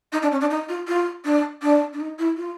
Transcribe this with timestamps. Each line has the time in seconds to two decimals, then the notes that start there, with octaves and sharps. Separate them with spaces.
0.12 D#4
0.22 D4
0.31 C#4
0.40 D4
0.50 D#4
0.68 F4
0.87 F4
1.24 D4
1.62 D4
1.93 D4
2.00 D#4
2.18 E4
2.37 F4